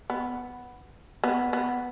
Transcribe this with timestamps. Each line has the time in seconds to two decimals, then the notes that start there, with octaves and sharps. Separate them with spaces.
0.10 B3
1.24 B3
1.53 B3